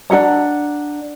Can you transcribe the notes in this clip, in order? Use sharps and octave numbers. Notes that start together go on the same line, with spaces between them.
D4 A#4 F#5 A#5